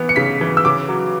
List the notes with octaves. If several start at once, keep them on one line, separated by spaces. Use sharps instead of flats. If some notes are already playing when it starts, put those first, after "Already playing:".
Already playing: E3 B3
C#7
C#3 B6
E3
E6
C#3 D6
F#3